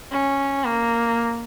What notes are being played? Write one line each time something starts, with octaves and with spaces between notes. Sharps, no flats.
C#4
A#3